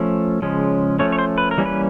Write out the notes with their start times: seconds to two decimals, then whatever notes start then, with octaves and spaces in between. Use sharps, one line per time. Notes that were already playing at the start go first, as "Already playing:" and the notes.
Already playing: F3 A3 C#4
0.42 C#3 F3 G#3 C#4
0.99 F3 A3 C#4 C#5
1.12 C#5
1.19 C5
1.38 B4
1.51 A#4
1.57 E3 G3 A#3 C#4
1.66 B4